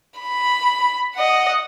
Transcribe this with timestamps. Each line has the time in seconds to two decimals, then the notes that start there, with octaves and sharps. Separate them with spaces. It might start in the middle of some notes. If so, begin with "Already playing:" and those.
0.20 B5
1.16 D#5 F#5